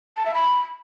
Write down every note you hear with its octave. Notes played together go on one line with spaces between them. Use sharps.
A5
E5
B5